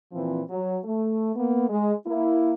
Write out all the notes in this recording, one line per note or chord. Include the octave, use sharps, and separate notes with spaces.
A#2 E3 F3 C4
F#3
A3
A#3 B3
G#3
A#3 E4